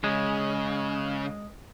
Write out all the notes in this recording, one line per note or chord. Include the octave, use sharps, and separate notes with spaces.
C#3 G#3